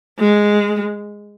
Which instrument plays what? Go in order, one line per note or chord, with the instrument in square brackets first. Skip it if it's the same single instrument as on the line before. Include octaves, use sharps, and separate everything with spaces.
[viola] G#3